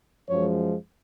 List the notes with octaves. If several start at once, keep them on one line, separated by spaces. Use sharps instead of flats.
F#2 F3 G#3 C#5